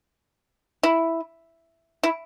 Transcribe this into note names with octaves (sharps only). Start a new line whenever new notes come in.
E4
E4